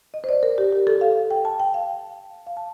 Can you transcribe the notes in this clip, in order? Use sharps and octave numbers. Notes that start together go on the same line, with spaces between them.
D#5
C5
D5
A#4
G4
G4
A4
F5
G5
A5
G5
F5
F5
A5